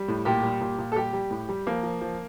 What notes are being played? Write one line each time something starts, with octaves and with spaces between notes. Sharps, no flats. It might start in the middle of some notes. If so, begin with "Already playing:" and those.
Already playing: G3
A2
A#2 G4
G3
A#2
A#2
A4
G3 G4
G3
A2
G3
F3 A#3
F3
F3